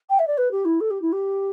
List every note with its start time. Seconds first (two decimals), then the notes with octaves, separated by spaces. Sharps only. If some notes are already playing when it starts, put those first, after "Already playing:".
0.09 G5
0.19 E5
0.27 D5
0.37 B4
0.51 G4
0.65 E4
0.80 A4
0.90 G4
1.02 E4
1.12 G4